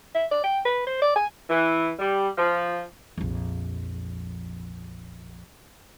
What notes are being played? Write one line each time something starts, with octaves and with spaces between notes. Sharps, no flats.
E5
D5
G5
B4
C5
D5
G#5
E3
G3
F3
A#1 F2